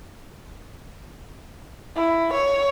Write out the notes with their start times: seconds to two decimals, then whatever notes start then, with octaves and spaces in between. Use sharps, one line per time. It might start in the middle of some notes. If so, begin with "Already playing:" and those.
1.96 E4
2.33 C#5